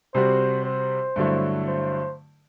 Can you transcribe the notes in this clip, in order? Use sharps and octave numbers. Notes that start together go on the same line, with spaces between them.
C3 G3 C4 F#4 C5
C5
G2 D3 F#3 A3 E4
C5